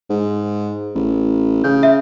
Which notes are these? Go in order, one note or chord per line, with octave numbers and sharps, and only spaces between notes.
G#2
A1
C#3 G6
E5